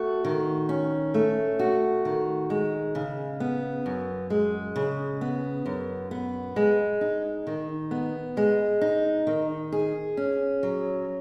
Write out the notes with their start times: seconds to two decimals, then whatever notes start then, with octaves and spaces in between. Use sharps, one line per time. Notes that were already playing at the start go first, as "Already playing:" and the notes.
Already playing: A3 F#4
0.25 D#3
0.69 C#4
1.14 A3
1.59 F#4
2.05 D#3
2.50 G#3
2.95 C#3
3.40 B3
3.86 F#2
4.30 G#3
4.76 C#3
5.21 B3
5.66 F#2
6.11 B3
6.56 G#3
7.01 D#4
7.47 D#3
7.91 B3
8.37 G#3
8.81 D#4
9.27 D#3
9.72 G#4
10.17 C#4
10.63 F#3